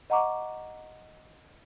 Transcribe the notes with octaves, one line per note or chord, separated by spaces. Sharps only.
D#5 F#5 A#5 C#6 D6